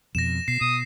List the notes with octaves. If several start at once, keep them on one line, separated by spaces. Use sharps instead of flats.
F2 B2 A#6 E7
B2 C7
B2 D#6